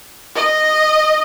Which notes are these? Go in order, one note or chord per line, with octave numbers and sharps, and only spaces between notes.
D#5